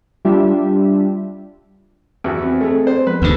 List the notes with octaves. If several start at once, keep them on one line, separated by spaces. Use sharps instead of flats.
G3 D4 F4 G4 E5
E2 E3 F#4
C4
G#3 A3
C5
F3 G#3 B3 B4
D2 D3